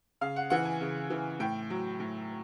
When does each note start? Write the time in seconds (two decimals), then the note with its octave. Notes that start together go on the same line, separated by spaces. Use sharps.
0.21 C#3 F5
0.36 F#5
0.50 E3 F#5
0.65 G#5
0.81 C#3
1.10 E3
1.40 A2 G5
1.70 F#3
2.00 A2